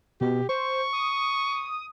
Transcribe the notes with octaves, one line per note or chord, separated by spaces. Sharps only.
B2 G4
C5 C#6
D#6